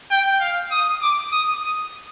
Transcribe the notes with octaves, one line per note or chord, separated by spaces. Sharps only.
G5
F5
D#6
D6
D#6
D#6